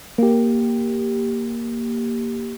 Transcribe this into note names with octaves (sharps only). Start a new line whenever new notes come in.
A#3 G4